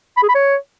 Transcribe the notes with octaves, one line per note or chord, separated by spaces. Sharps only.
B5
G#4
B5
C#5